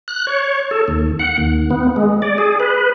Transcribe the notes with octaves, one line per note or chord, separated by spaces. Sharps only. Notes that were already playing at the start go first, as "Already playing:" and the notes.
F#6
C#5
A4
D#2
F#5
D#2
B3
G#3
D5
G#4
B4